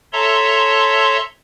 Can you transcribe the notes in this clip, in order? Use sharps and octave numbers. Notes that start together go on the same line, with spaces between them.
A4 C#5 E5 A5 A#5 C6